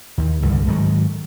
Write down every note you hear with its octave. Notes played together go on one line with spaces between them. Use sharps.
D#2
C2 G2 D3
G#2 D#3 E3 F#3